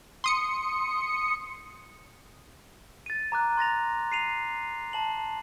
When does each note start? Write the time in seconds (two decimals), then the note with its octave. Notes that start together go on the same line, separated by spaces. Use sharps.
0.24 C6 D#6 C#7
3.06 A6 D#7
3.32 A#5 D6 F#6
3.57 C6 A6 A#6 F7
4.12 C7 D#7 F7
4.93 A5 F#7